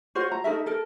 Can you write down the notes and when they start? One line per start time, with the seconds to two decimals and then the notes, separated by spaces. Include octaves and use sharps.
0.15 F4 F#4 C5 C#5
0.32 A#5
0.44 D#4 A4 A#4 E5
0.66 A4 A#4